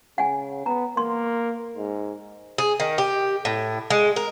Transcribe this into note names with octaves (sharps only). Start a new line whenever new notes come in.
C#3 F#5 G#5
B3 A#5
A#3 C6
G#2
G#4
D#3
G4
A2
G#3
A#4